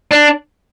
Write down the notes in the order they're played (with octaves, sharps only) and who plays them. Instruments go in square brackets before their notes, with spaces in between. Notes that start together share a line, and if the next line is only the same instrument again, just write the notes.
[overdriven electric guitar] D4